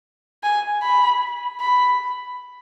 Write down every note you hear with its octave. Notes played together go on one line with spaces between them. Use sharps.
G#5
B5
B5